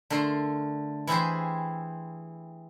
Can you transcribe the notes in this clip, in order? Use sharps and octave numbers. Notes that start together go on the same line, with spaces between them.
D3 A3 A#4 C6
E3 E4 G4 G#4 C5